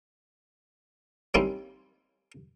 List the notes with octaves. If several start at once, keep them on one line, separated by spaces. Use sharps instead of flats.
G3 A#3 C4 C#4 D#4 E4